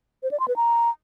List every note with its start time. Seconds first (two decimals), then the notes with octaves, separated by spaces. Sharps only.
0.23 C5
0.31 D5
0.40 C6
0.48 B4
0.56 A#5